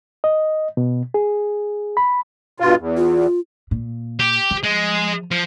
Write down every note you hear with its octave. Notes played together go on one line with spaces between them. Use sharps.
D#5
B2
G#4
B5
G2 B2 F4
E2
F4
A#2
G4
F3
G#3
F3